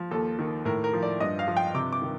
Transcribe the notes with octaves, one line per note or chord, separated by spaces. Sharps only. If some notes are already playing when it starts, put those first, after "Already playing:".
Already playing: F3
D#2 A4
D#3
A2 A#4
A#4
F3
D5
G2 D#5
F5
F3
G5
C3 D6
D6
D#3